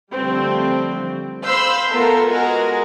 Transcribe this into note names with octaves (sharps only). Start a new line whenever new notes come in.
D3 F3 G3 A3 C4
C5 F5 B5 C6 E6 G6
A3 B3 F4 A4 A#4
G#3 F#4 G#4 A#4